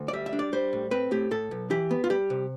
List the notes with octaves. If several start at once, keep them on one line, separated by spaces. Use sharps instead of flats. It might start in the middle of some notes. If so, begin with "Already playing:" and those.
Already playing: D2
D5
G3 E5
E5
D4
D5
G3 C5
A2
C4 B4
A2 G4
A2 A4
B1
E3 G4
B3
F4
G3 G4
C3